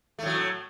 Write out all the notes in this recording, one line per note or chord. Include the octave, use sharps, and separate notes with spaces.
A2 F#3 A3